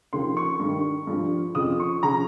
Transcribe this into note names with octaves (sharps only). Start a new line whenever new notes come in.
D#2 C#3 F3 C6
C#6
G2
D#3
G2 F3
F2 C#3 F3 D#6
C#6
C#3 F3 A#5